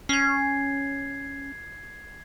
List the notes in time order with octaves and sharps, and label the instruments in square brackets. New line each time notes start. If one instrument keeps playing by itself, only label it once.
[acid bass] C#4 [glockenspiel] G#6 C7